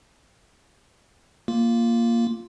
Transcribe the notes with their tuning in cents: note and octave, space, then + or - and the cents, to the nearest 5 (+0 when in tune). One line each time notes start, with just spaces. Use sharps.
A#3 +0 F4 +0